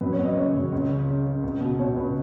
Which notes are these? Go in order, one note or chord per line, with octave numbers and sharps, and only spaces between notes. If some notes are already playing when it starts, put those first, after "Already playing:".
F#2 B4
C#5
F#2
D#5
C#3 C#5
F#2
C#2
C#3
C#3
C#3
C#2
B2
B2 C#5
C#2 B4